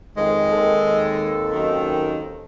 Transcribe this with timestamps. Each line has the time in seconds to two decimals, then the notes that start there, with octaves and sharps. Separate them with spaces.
0.17 F2 D#3 G#3
0.52 D#2 C4 A4
1.51 F#2 D#3